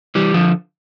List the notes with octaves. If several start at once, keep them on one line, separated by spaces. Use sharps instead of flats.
E3 G3
D3 F3